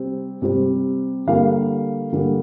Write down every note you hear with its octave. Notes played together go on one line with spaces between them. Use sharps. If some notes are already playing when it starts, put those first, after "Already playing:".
Already playing: C3 G3 C4
C3 G3 C4
D3 G3 A#3 F5
D3 G3 A#3